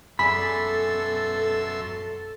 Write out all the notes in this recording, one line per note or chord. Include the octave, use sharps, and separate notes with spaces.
F#2 B2 G#4 A4 D5 E5 B5 C6